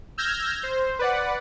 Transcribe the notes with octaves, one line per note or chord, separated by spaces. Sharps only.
E6 F6 G6 G#6 A#6
C5
B4 D5 F#5